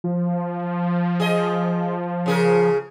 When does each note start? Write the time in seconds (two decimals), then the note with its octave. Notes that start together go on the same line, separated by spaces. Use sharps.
0.04 F3
1.20 G#4 D#5
2.26 C#3 G#4 A#4